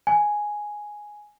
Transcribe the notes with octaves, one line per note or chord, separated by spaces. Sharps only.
G#5